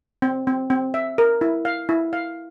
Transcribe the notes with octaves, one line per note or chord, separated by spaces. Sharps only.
C4
C4
C4
E5
A#4
E4
F5
E4
F5